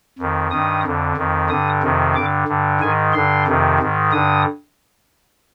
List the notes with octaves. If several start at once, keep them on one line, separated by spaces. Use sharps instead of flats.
F2 D#3
G2 D#3 D#6
F2 D3
F2 D#3
G2 D3 D#6
F2 C3 D#3
G2 D3 D6
G2 D3
G#2 D#3 G#5
G2 D3 C6
F2 C3 D#3
G#2 D#3
G2 D3 D#6